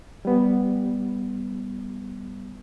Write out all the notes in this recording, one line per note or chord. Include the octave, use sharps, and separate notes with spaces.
G3 B3